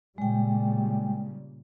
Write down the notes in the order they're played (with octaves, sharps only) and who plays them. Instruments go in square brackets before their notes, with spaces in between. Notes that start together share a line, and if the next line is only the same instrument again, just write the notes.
[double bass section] A#2 C#3 G3 [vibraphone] G#3 G5